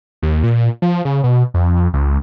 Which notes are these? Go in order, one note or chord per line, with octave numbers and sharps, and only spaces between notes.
D#2
A#2
F3
C#3
B2
F2
C#2